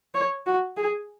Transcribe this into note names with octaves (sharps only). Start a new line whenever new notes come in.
C#5
F#4
G#4